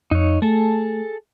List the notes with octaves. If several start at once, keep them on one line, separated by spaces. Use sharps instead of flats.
F2 D#4 C#5
A3 G#4 A4 A5